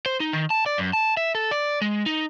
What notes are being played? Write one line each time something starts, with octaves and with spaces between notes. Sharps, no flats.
C5
D#4
D#3
A5
D5
F#2
A5
E5
A4
D5
G#3
D#4